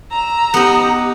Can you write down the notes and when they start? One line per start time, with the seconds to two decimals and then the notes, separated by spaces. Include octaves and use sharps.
0.11 A#5 E6
0.54 B3 D#4 G4